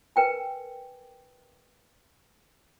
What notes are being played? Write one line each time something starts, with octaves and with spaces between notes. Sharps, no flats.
A#4 B4 G5 G#5